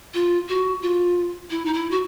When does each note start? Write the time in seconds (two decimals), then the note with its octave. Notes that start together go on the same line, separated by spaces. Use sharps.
0.14 F4
0.49 F#4
0.82 F4
1.50 E4
1.65 D#4
1.73 E4
1.91 F#4